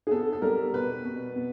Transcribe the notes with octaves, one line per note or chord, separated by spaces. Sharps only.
G#4
B3 A4
A4
G3 A#4
B2 B4
B2
B3